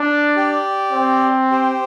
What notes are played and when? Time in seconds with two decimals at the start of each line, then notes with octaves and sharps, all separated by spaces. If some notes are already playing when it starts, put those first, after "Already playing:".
Already playing: D4
0.36 G4 D5 G5
0.93 C4
1.51 G4 C5 G5